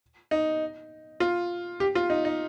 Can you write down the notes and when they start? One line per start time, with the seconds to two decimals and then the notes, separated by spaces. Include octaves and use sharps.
0.31 D#4
1.20 F4
1.80 G4
1.95 F4
2.10 D#4
2.25 D#4